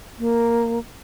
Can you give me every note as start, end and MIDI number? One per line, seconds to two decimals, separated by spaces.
0.19 0.79 58